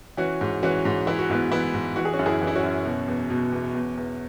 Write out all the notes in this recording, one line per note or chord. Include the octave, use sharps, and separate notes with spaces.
E3 C#4 F#4
G#2
E3 C#4 F#4
G#2
E3 E4
F#4
G#2 B3 E4
E3 B3 E4
G#2
E3 F#4
G#4
C#4 F#4
F#2
E4 G#4
E3
E4
C#4 F#4
F#2
B2
E2
B2
E2
E2
E2